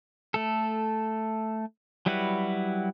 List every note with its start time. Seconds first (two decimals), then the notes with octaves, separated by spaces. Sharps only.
0.34 A3 A4
2.06 F#3 G3 E4 F#4 B4